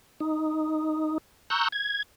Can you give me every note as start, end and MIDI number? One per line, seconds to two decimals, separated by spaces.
0.20 1.18 63
1.50 1.68 82
1.50 1.68 85
1.50 1.68 88
1.50 1.68 90
1.50 1.68 91
1.72 2.03 92